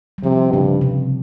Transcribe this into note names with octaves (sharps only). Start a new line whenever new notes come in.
G3
C3 F3
G2 C#3
C3